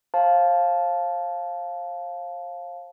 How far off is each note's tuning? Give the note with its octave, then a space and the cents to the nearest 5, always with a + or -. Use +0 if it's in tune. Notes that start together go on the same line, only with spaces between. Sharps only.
C5 +40 F5 +0 A5 -15